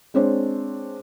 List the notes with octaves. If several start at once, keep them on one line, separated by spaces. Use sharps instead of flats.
G#3 C4 D4 C5 C#5